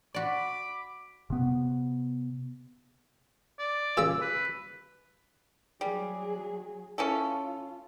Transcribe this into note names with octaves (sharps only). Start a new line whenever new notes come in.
F#4 D5 B5 D6
C3 B3
D5
A#2 C#3 F5 E6
B4
F#3 G3 G#4
C#4 E4 F4 A4